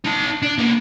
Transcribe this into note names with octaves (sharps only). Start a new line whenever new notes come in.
D#4 A5
D4
A#3 B3